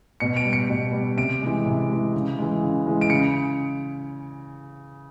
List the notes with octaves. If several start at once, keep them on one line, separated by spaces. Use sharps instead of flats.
B2 C#7
D7
G3
C#7
B2
G3
C3 D7
E3 G#3
C3
E3 G#3
C#3
E3 G#3
C#3
E3 G#3
D7
C#3 C#7